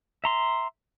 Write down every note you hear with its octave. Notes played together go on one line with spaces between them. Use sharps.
E5 A#5 C6